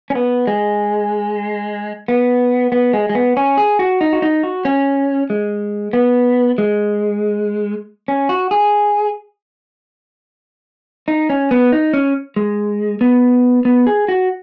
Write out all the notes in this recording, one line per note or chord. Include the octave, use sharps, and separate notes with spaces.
C#4
B3
G#3
B3
B3
G#3
G#3
B3
C#4
G#4
F#4
D#4
F#4
D#4
F#4
C#4
G#3
B3
G#3
C#4
F#4
G#4
D#4
C#4
B3
D#4
C#4
G#3
B3
B3
G#4
F#4